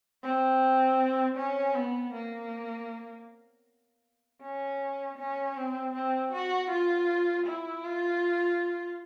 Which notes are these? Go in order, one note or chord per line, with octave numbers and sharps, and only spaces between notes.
C4
C#4
B3
A#3
C#4
C#4
C4
C4
F#4
F4
E4
F4